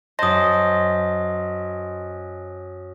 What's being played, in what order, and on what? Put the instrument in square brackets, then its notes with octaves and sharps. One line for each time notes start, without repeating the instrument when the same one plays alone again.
[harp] F#2 C5 [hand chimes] D#5 A5 C6 [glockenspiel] D#6 A#6